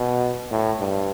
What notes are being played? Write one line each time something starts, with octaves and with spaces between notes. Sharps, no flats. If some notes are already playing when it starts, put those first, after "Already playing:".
Already playing: B2
A2
G2